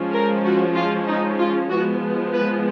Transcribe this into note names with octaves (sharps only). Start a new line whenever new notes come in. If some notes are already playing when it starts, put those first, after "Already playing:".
Already playing: F3 G#3 C#4
A#4
F#4
F4
D#4
F4
F3 G#3 B3 F#4
B4